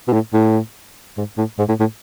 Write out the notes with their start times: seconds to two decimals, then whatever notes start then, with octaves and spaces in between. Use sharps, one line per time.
0.08 B2
0.13 A2
0.34 A2
1.18 G#2
1.38 A2
1.59 G#2
1.69 A2
1.80 A2